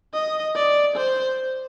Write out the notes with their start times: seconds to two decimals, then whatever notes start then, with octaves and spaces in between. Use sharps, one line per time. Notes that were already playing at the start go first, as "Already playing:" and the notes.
0.14 D#5
0.56 D5
0.96 C5